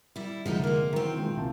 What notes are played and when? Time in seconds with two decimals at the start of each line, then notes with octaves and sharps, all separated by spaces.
0.16 G3 E4
0.46 F1 D3 F3 G#3 D#4
0.64 G#3 A#3
0.93 D#3 E3 F#3 C4
1.17 A#2 E3 G#3
1.37 C2 A#3 A5